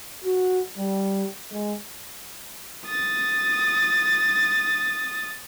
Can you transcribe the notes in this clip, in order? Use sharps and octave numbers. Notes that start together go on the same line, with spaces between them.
F#4
G3
G#3
D#6 A6